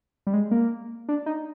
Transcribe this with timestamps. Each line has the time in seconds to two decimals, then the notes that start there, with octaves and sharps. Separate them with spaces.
0.27 G3
0.34 G#3
0.51 A#3
1.09 D4
1.26 D#4